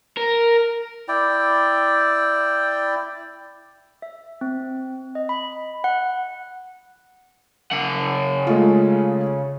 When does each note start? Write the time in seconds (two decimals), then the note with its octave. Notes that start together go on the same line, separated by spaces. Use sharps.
0.17 A#4
1.08 E4 D5 G5
4.02 E5
4.41 C4
5.15 D#5
5.29 B5
5.84 F#5
7.72 C#3 F#5
8.47 G#3 A3 F4